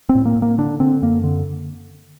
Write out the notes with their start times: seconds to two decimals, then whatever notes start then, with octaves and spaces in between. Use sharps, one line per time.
0.09 C4
0.15 A2
0.25 A#3
0.36 A2
0.42 A#3
0.58 D3 D4
0.80 D3 C4
1.02 F#2 A#3
1.24 D3